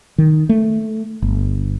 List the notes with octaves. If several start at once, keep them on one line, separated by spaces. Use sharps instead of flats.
D#3
A3
G1